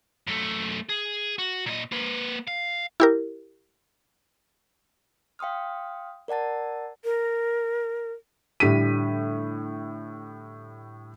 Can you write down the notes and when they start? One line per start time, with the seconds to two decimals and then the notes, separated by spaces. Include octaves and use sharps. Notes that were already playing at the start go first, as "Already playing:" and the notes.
0.27 F#2 A3
0.89 G#4
1.38 F#4
1.66 A#2 D#5
1.92 A#3 B4
2.47 F5
3.00 E4 G4 A#4
5.39 F5 G5 C6 D#6 F6
6.28 A#4 D5 F#5 A5 A6
7.04 A#4
8.60 A2 D3 G3 B6 D#7